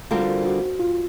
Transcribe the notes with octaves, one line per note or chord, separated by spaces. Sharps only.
D3 G3 C4 F4 F#4 A#4
F#4
F4